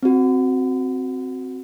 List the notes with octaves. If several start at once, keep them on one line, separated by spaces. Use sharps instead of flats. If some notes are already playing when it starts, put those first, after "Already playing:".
C4 F#4